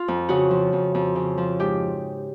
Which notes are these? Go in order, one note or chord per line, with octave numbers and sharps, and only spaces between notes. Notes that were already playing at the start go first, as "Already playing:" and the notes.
Already playing: F4
F2
C#3 F#4
F3
F2
F2
C#3
F3
G#2 G4